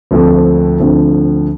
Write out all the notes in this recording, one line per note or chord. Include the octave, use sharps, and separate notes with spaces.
D2 D3 F3 A3 C4
D2 D3 F3 A3 C4